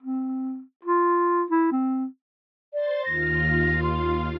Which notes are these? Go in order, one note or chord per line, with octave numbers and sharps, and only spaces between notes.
C4
F4
E4
C4
C5 D5 C6 A6
D#2 F4 F5 A#6
C6